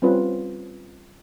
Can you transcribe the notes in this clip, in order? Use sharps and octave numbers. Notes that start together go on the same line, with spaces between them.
G3 C4 C#4 F4 B4